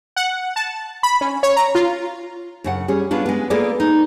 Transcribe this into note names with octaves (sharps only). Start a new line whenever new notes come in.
F#5
A5
B5
C#4
C#5
A#5
F4
F#2 C#3 F#5
G3 C#4 G#4
B3 C#4 D4 F4
G#3 B3
A#3 B3 F4 G#4 A4 D5
D#4